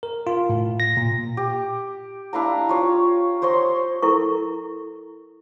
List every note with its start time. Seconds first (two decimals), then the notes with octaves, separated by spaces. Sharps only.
0.03 A#4
0.27 F4
0.49 A2
0.80 A#6
0.97 A#2
1.37 G4
2.33 D4 E4 F5 A#5
2.69 F4 C#5
3.42 C5 C#5 D#5 C6
4.02 E4 A4 A#4 C#6